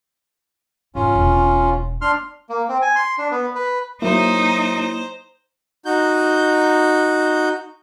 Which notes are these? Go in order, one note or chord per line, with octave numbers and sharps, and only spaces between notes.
G#2 E3 C#4 F4
E1
D4 C6 F6
A#3
C4
G#5
C6
D4
B3
B4
F#3 A#3 D#4 E4 C5 C#5 A#5
D#4 F#4 G6